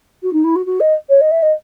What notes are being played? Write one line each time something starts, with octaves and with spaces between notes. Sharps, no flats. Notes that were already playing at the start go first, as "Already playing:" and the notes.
F#4
D#4
E4
F#4
F#4
D#5
C#5
D#5
E5
D#5